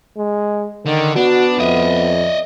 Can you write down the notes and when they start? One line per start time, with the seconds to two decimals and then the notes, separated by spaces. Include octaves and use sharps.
0.17 G#3
0.86 D3 D#3
1.16 B3 D4 F#4
1.60 F2 D#5 E5